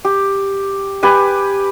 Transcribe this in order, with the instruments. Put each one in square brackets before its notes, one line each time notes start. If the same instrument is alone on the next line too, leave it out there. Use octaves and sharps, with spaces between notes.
[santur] G4
G4 B4 G#5